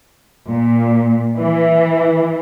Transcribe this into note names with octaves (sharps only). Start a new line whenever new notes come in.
A#2
E3